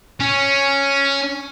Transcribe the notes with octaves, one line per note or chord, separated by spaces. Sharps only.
C#4